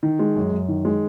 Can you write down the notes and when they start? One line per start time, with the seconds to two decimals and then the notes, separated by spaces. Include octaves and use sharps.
0.03 D#3
0.19 G#3
0.36 F#2
0.52 F#2
0.68 D#3
0.85 G#3